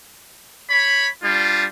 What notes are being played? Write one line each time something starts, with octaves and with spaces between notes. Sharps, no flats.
C#5 B5
G3 D4 F4